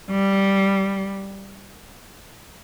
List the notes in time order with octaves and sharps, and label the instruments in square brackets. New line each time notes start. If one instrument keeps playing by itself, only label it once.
[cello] G3